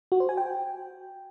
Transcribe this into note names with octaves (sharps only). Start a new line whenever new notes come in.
F#4
C5
G#5
G5